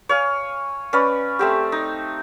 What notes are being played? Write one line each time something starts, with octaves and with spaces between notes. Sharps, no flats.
C#5 F5 G#5
C#4 B4 D5
A3 C4 G4
D#4